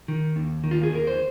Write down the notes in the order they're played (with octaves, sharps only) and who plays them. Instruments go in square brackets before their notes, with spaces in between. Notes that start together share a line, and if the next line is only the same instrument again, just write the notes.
[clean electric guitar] D#3
D#2
D#3
F4
G#4
D#2 A#4
C5